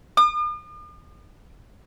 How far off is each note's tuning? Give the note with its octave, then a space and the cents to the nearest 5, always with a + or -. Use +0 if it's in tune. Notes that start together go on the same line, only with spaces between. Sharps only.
D#6 -45